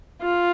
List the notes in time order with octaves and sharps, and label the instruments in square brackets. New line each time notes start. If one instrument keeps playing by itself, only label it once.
[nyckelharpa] F4